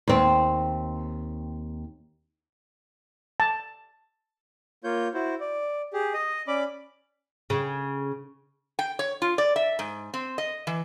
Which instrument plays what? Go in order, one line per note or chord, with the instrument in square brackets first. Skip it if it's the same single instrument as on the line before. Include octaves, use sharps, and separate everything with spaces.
[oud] D#2 C4
[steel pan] A5
[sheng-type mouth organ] A#3 F4 C#5 G6
E4 F#4 C5
D5
G4 G#4
D#5 D#6
C#4 D5 B5 D6
[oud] C#3
[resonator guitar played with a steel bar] G5
C#5
F4
D5
E5
G#2
C4
D#5
E3